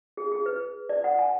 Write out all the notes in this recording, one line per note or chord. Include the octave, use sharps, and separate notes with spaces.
G#4
G#4
B4
D5
F#5
G#5